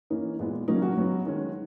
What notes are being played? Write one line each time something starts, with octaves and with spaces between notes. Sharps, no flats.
E3 A#3 C#4 D#4
A#2 G#3 B3
C#3 F#3 A#3 C#4 D#4
F#4
C#3 F#3 B3
D#3 G#3 C#4